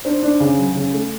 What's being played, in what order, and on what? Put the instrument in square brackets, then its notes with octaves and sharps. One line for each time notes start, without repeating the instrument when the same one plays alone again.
[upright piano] D4 C5
D4
C#3
F#3
C#3
A3